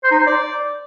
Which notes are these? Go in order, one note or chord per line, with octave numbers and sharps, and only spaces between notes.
C5
D#4
C5
D5